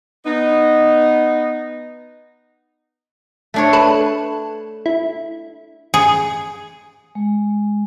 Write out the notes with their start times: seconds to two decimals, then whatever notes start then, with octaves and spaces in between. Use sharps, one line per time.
0.25 B3 D#4
3.54 A3 D4 C#5
3.73 A4 B4
4.86 E4
5.94 G#4
7.15 G#3